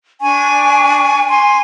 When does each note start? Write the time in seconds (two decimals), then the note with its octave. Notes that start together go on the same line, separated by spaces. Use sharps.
0.22 D4 G#5 C#6
1.29 G#5 C6